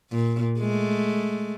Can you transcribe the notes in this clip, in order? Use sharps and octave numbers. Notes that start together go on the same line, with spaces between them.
A#2
G#3 A3